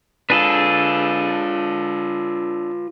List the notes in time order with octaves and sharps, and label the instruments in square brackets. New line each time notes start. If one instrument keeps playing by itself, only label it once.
[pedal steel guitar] D4 G#4 A4 [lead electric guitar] F4 B4